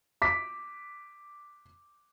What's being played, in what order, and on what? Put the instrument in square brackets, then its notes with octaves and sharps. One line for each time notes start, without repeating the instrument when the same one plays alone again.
[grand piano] D6 B6